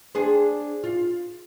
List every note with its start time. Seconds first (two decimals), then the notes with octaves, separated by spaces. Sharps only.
0.15 D4 G#4 C5
0.84 F4